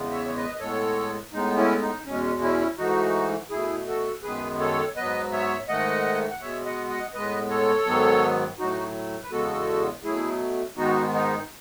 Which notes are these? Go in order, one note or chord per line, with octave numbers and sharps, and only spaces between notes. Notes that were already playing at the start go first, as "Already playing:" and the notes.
Already playing: E2 C#3 E3 G#3 B3
C#5 E5
C#5
B4 D#5
D#5
A2 G#3 B3 A4 C#5
A2 G#3 B3 D#4
C#4 E4
D#4
E2 B2 G#3 C#4
C#4 E4
G#2 E3 A3 D#4 F#4
B2 A3 E4 G#4
F#4 A4
F#2 D#3 G#3 B3 G#4 B4
A4 C#5
G#2 F#3 B3 B4 D#5
C#5 E5
G#2 D#3 A3 D#5 F#5
F#5
B2 G#3 B3 C#5 E5
D#5 F#5
D#5 F#5
A2 G#3 B3 B4 D#5
A4 C#5
G#2 D#3 F#3 B3
A2 F#3 A3 D#4 F#4
B4
E2 C#3 G#3 B3 F#4 A4
B2 F#3 A3 E4 G#4
G#2 D#3 G#3 B3 D#4 F#4
D#4